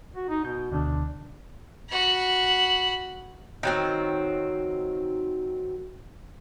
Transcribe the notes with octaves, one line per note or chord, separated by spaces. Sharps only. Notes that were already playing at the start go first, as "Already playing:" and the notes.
F#4
D#4
B2 G6
D2 B2 D3 D4
F#4 B5
D#3 F#3 C4